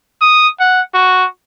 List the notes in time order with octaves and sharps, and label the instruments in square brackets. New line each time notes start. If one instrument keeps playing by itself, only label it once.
[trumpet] D#6
F#5
F#4